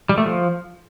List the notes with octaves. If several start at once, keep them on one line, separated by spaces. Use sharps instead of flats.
G3
A3
F3